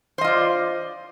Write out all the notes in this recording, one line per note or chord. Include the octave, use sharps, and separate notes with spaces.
F4 C5 D5 D#5